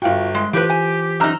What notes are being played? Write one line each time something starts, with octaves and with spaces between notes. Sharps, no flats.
G1 F4 F#4 G5
G#3 C6
A2 E3 F4 G4 B4 C5 D7
G#5
F#2 D#4 A#5 E6 F6